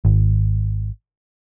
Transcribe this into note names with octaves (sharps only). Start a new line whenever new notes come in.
G#1